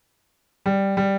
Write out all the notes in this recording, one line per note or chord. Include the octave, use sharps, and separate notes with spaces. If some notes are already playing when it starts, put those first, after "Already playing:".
G3
G3